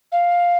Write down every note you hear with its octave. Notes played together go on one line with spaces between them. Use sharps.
F5